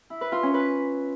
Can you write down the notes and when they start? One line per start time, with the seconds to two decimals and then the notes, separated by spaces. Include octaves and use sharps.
0.10 E4
0.21 B4
0.32 F4
0.43 C#4
0.54 B4